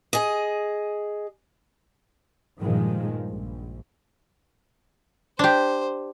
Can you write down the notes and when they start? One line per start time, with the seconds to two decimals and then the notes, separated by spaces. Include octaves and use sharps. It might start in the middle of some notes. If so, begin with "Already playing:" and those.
0.13 G#4 D#5
2.59 G2 A#2 D#3 F3 G#3
3.28 A#1
5.39 D4 G4 C5